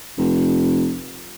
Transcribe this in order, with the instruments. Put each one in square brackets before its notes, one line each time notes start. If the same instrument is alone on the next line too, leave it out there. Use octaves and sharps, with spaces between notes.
[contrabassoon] F1